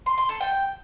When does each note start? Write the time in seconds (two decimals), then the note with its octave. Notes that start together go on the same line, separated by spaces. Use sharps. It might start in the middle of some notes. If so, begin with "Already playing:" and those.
0.06 C6
0.18 C6
0.29 A4
0.41 G5